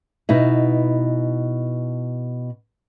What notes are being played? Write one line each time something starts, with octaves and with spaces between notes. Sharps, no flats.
B2 D#4 E4